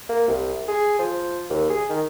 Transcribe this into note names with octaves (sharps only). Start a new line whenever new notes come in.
A#3
C2
G#4
F3
D#2
G#4
D#3